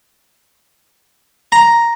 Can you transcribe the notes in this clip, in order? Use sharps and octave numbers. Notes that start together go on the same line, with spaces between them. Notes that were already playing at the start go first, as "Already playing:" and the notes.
A#5